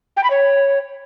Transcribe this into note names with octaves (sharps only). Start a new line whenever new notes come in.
G5
B5
C#5